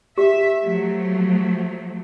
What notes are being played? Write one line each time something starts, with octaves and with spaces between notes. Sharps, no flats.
G4 E5
F3 F#3 A3